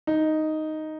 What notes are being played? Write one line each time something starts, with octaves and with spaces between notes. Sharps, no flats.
D#4